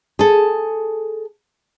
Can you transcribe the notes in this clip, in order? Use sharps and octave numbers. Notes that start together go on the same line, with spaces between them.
G#4 A4